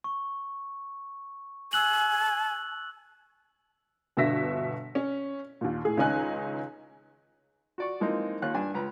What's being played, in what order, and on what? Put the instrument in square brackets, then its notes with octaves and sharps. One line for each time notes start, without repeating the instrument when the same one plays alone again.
[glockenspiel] C#6
[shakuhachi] G#5 [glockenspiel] E6 F#6 F#7
[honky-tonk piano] G1 B2 D3 E5 A#6 B6
C#4
D#2 A#2
A2 G#4
C#2 D#3 C#4 D#4 G#5 F#6
[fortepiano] F#4 D5 C#6
E3 F3 G#3 A#3 C4 D#4
D#2 F4 C#5 F#6
G2 D4 G#5
C#2 B4 A#5